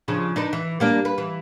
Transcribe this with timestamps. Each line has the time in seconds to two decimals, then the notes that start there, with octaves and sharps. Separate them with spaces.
0.08 C#3 F3 D4
0.36 D4 D#4 B4
0.53 E3
0.80 G3 A#3 D4
1.05 B4
1.18 E3